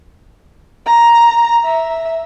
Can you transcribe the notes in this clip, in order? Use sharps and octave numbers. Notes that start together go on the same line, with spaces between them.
A#5
E5